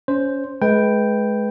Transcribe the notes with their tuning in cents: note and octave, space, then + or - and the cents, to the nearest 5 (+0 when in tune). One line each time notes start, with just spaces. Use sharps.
C#4 +20 C5 +0
G#3 +30 B4 +0 G5 +0